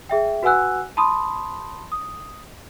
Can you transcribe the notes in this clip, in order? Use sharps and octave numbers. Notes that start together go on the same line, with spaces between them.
G#4 E5 G5
F#4 B4 F#5 G#5 E6 F#6
A5 B5 C6 D#6
D#6